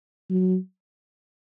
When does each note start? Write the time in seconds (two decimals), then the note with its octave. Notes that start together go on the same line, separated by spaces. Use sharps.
0.30 F#3